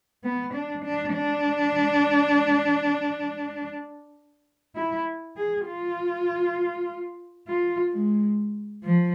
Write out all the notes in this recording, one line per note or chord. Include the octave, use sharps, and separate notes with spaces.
B3
D4
D4
D4
E4
G#4
F4
F4
G#3
F3